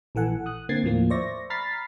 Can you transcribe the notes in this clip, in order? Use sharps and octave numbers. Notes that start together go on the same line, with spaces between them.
A#1 E3 A4 F#5 G#5
D#6 F#6
D3 A#3 C4 G#6 A6 C7
D#2 A2 F3 A#3
C5 D5 E5 C#6 A#6
A#5 B5 F6 A6 B6 C7